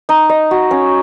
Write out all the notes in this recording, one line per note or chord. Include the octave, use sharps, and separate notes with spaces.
D#4
D#5
F#4
C#4